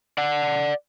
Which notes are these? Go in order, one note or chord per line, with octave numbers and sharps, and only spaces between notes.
D5 F#5